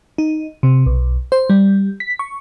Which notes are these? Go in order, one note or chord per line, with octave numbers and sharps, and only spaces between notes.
D#4
C3
B1
C5
G3
B6
C#6